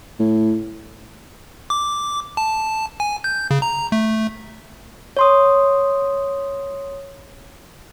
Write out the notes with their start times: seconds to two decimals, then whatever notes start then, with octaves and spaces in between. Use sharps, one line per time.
0.20 A2
1.70 D6
2.37 A5
3.00 G#5
3.24 G6
3.51 C#3
3.62 A#5
3.92 A3
5.17 C#5 C6 D#6